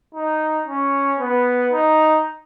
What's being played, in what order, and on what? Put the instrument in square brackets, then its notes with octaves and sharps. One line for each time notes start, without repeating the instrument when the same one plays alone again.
[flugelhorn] D#4
C#4
B3
D#4